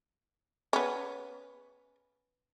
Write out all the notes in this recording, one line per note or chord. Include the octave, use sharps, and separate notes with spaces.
B3 C#4